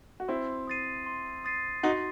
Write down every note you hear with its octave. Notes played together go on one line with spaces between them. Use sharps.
F#4
C4 E4 C6
D#6 A6 C7 D#7
C6
D#6 A6 C7 D#7
D#4 F#4 C6